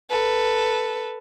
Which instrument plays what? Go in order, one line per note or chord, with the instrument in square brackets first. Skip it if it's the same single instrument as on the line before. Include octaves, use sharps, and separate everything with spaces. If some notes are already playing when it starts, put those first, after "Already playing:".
[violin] A4 B4